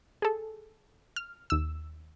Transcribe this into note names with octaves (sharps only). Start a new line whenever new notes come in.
G#4 A4
F6
D#2 E6